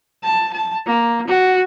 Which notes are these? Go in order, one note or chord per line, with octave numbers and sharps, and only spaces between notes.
A5
A5
A#3
F#4